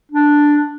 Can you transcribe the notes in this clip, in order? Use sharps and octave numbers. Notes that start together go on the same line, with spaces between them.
D4